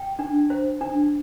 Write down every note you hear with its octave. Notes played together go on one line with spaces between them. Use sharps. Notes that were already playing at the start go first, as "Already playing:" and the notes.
Already playing: G5
D4
C5
D4